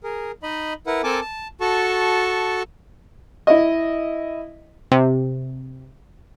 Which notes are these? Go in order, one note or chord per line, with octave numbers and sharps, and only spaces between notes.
G#4 A#4
D#4 D#5 B5
E4 A#4 B4 F#5
C4 A4 A#4 G#5 A5 D6
A5
F#4 A4 A5 C#6
E4 D#5
C3